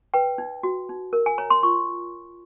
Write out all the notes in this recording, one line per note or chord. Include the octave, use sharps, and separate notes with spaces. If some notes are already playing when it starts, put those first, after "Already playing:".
B4 G5
D#4
F#4
D#4
A#4
G#5
C#5 A#5
C6
F4 C#6